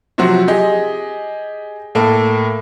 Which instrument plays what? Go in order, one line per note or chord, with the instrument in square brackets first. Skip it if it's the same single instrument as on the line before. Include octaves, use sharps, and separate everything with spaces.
[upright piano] C3 F3 F#3 C4 F#4
G4 G#4 D#5
A2 A#3 A4